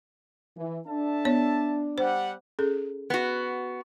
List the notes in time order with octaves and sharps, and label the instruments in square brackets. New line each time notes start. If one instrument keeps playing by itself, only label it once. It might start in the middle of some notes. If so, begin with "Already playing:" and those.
[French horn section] E3
[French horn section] D4 [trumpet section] A4 E5 A5
[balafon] B3 C#5
[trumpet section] G3 F#5 [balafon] C5
[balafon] C#4 G#4 A4
[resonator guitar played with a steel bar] B3 F#4